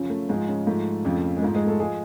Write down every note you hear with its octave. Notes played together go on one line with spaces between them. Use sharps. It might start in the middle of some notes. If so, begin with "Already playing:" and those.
Already playing: F#2 C#3 F3 C#4
A3
G#2 F3 G#3
C#3 C#4
G#2 F3 A3
F2 C#3 F3
G#3
G#2 F3 A3
G#3 G#4
A3 A4
F3 G#3 G#4